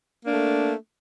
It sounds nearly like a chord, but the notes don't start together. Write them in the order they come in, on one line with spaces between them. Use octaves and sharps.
A#3 D4 A3